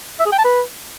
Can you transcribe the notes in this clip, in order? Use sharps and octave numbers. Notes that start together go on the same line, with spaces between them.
E5
G#4
G5
A5
B4